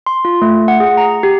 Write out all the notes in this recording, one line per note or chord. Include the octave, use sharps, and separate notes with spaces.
C6
F4
A3
F#5
G#4
A#5
G4